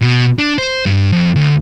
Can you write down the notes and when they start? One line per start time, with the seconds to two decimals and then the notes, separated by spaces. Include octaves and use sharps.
0.01 B2
0.39 D4
0.58 C5
0.86 G2
1.13 F2
1.36 D2